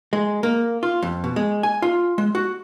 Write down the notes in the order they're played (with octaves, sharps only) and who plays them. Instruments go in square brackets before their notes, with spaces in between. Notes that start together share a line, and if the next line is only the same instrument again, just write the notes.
[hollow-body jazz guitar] G#3
A#3
F4
F2
B2
G#3
G#5
F4
G#3
F#4